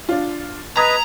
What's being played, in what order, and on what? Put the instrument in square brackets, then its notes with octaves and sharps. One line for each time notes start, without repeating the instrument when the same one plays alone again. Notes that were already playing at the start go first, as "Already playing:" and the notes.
[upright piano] D4 F4
[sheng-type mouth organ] B4 D#5 [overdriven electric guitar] A#5 [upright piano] D#6 G#6 B6